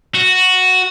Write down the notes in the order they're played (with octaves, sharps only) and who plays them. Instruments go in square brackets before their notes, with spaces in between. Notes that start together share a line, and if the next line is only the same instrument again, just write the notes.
[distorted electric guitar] F#4